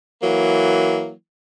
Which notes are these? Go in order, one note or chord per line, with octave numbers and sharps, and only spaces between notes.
E3 F#3 A#3